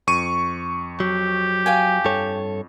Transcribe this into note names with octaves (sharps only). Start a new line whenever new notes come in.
F2 C#6 D#7
F#3 G4
F5 G5 G#5
G2 A4 C#5